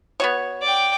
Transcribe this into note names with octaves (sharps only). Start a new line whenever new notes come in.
B3 F#4 C#5
D5 G5